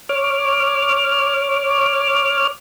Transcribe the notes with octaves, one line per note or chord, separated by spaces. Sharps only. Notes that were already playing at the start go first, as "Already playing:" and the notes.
C#5 D6 F6